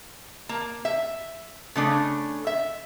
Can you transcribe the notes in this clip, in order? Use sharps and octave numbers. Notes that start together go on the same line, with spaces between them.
A#3
E5
C#3 A3 D4
E5